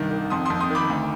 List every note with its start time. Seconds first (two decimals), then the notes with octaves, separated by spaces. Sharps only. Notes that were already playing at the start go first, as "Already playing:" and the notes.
Already playing: C2 G2 D#3
0.11 D#3
0.30 F2 C6 D#6
0.45 F2 C6 D#6
0.60 C6 D#6
0.70 D#3 B5 D6
0.90 D2